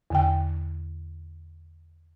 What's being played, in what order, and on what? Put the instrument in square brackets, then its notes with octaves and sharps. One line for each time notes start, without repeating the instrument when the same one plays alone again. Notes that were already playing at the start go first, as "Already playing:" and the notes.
[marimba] E2 D3 G5